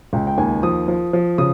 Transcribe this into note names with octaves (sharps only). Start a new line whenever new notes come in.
C#2 G5
G5
D#2 G#5
F3 D#6
F3
F3
C#3 D#6